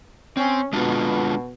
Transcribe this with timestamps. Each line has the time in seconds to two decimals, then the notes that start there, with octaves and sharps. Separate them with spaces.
0.37 C4 C#4
0.73 B2 G#3 D4 F4